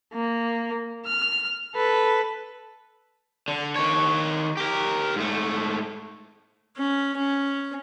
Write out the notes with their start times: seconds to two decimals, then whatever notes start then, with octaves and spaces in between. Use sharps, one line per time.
0.14 A#3
1.06 F6
1.75 A4 B4
3.48 D3
3.76 D#3 C#5
4.57 G4 A#4
5.16 G#2 A3
6.77 C#4
7.17 C#4